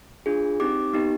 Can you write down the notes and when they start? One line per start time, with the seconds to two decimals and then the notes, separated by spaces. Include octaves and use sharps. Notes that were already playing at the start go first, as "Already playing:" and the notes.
0.26 D4 F4 G#4
0.60 C4 D#4 G4 D6
0.93 B3 D#4 G4